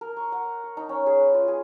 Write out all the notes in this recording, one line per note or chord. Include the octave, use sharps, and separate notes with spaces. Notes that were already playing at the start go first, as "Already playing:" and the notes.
A#4
C#6
F#5
C#6
D#4
C#4
G#4
B4
F4
G#4